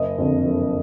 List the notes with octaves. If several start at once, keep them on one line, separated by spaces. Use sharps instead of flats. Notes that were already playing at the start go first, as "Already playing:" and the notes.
Already playing: F#1 D#5
F2 D3
F#1